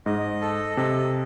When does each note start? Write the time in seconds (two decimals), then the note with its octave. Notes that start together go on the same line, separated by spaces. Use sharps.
0.06 G#2 D#5
0.41 A4
0.77 C3 D#5